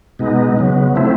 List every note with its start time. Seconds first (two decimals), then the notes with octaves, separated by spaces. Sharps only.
0.19 B2 G#3 B3 D#4
0.57 C#3 F#3 B3
0.96 F3 A3 C4 E4